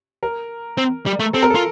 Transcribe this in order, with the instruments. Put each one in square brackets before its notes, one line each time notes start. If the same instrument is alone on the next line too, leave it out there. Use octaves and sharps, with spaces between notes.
[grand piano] A#4
[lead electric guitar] C4
G3
A3
[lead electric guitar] C4 [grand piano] A4
[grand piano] A#4
[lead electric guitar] F4 [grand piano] A4